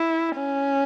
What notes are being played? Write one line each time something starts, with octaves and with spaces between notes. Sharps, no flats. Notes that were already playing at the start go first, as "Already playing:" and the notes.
Already playing: E4
C#4